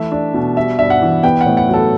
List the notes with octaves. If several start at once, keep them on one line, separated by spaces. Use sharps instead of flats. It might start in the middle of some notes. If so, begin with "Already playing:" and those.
Already playing: E3 A3 E5
D4
B2
G3 E5
G2 E5
F#5
E3
B3 G5
F#5
A2
F#5
F#3
A4